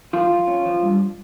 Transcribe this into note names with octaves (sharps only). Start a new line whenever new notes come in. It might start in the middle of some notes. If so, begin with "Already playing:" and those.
F3 F4
F3
C#4
F3
G2